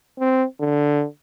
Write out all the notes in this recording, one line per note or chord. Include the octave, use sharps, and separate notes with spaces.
C4
D3